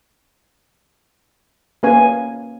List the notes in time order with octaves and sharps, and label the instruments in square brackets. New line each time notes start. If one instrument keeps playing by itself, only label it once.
[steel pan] A#3 C#4 B4 F5 G#5